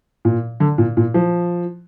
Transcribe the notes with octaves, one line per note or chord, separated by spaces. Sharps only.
A#2
D3
A#2
A#2
F3